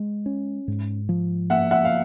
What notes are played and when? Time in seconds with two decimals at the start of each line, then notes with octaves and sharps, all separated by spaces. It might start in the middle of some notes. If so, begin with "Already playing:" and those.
Already playing: G#3
0.26 C#4
0.68 G#2
1.09 F3
1.50 A#3 E5 F#5
1.71 E5 F#5
1.85 F5